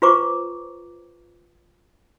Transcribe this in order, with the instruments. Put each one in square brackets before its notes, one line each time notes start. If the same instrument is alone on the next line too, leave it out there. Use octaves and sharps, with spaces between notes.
[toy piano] F4 B4 C5 A#5 C#6 D6